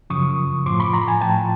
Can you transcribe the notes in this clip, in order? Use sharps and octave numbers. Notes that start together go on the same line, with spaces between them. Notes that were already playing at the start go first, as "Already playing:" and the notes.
F#2 C#3 F3 C#6 D#6
A2 F3 C6 D6
B5 C#6
A#5 C6
B5
G#5 A#5
A2 F3 G5 A5